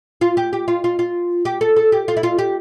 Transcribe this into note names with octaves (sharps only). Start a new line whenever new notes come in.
F4
G4
G4
F4
F4
F4
G4
A4
A4
G4
F4
E4
F4
G4